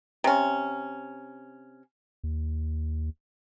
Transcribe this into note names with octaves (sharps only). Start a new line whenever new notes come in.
C3 C#4
D#2